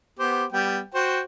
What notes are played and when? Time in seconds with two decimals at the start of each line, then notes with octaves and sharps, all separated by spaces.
0.19 B3 G4 C5
0.52 G3 B3 G5
0.94 F#4 C5 G5